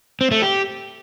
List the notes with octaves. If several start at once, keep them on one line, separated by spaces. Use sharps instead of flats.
C4
A3
G4